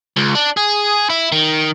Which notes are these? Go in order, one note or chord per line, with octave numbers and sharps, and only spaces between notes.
C#2
D4
G#4
E4
D#3